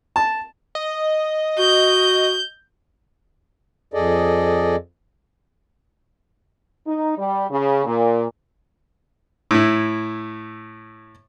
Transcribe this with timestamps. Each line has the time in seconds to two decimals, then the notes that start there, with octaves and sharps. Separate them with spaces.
0.16 A5
0.75 D#5
1.59 F#4 G6
3.94 F2 G#4 A4 D5 D#5
6.86 D#4
7.18 G3
7.49 C#3
7.86 A#2
9.51 A2 E4